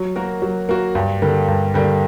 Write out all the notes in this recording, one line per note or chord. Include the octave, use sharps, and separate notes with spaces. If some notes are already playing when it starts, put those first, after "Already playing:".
Already playing: F#3
A#3 F#4 A#4
F#3
A#3 F#4 A#4
G2
D3 G3 A#3
G2
D3 G3 A#3